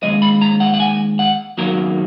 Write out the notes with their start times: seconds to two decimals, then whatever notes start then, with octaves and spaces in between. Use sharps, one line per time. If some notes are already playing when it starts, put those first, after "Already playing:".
0.03 D#2 D#3 G#3 D#5
0.22 B5
0.41 A#5
0.60 F#5
0.74 F#5
0.80 G#5
1.19 F#5
1.58 F#2 D#3 F#3 A#3 A#4